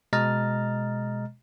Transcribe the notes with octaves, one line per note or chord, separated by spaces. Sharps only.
B2 G#3 D#5 A#5 F6 A6